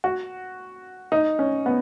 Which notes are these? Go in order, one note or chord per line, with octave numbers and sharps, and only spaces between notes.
F#4
D#4
C#4
B3